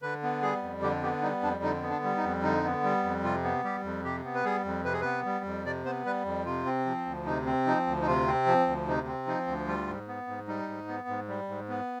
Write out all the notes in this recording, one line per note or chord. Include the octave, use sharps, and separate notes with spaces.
D3 B4
B3
G3 G#4
F2
D3 G4
B3 G4
G3 D#4
F2 D4
D3 D#4
B3
D4
G3
D#4
F2
D3 D#4
B3
G3
F2
C3 F4
B3
G3 G4
F2
C3 G4
B3
B4
G3 G#4
F2
C3 B4
G#4
B3 B4
G3
F2
C3 D5
B3 C5
G3 B4
F2
C3 F4
C4
F3
D2
C3 D#4
C4
F3 D#4
D2
D#4
C3 F4
C4
F3
D2
C3 D#4
C4
F3 D#4
D2
G3 F4
G#2
B3
G#2
G3 D#4
G#2
B3
G#2
G3
G#2
B3